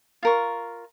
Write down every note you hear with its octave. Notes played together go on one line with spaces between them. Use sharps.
F4 A#4 C#6